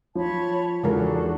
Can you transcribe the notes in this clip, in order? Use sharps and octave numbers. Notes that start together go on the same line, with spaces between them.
F3 C#5 A5 B5
E2 C#3 G#3 D4 D#4 F#4 A4 A#4